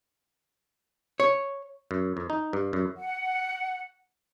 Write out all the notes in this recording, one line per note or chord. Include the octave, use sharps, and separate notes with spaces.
C#5
F#2
F2
D#4
G2
F#2
F#5